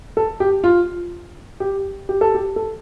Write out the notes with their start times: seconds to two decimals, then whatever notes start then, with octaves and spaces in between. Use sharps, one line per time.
0.17 A4
0.40 G4
0.64 F4
1.60 G4
2.09 G4
2.21 A4
2.35 G4
2.56 A4